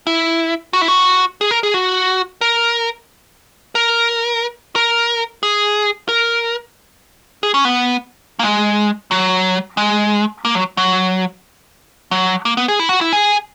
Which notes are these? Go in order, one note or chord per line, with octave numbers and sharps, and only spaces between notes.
E4
F#4
E4
F#4
G#4
A#4
G#4
F#4
A#4
A#4
A#4
G#4
A#4
G#4
C#4
B3
A#3
G#3
F#3
G#3
A#3
F#3
F#3
F#3
A#3
B3
G#4
E4
F#4
E4
G#4